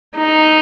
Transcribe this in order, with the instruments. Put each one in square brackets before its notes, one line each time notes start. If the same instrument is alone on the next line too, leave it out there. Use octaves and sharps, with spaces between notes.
[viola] D#4